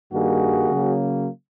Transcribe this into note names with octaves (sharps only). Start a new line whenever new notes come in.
G2 D#3 G3 A#3 F#4 G#4
C#3 F#3 A#3